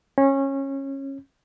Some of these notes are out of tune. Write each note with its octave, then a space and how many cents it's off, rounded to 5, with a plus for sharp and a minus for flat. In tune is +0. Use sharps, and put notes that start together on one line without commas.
C#4 -20